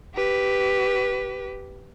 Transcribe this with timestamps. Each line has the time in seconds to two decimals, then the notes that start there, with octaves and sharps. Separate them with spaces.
0.15 G4 B4